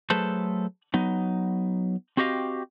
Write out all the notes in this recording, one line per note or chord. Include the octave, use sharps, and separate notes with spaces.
F#3 A3 G#4 A4 B4 C5
F#3 B3 D#4
C4 F#4 G4 D#5 F5